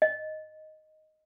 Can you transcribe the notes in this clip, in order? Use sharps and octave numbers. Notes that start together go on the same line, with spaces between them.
D#5